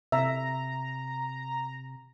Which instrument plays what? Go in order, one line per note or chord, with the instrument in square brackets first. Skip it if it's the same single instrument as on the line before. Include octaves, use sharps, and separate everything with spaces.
[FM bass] C3 [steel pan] E5 [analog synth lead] A#5